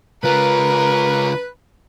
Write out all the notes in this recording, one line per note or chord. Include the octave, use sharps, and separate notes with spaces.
C#2 F4 A#4 B4